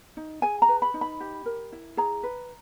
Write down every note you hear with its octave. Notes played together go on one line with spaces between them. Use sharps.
D#4
G#4 G#5
A#5
B4
B5
D#4
B5
G4
A#4
E4
G#4 A#5
B4